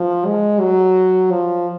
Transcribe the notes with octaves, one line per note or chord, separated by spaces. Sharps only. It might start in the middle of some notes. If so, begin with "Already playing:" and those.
Already playing: F3
G#3
F#3
F3